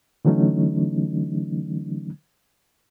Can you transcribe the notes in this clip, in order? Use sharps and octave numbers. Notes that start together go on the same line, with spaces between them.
D3 E3 F#3 A3 C#4 D#4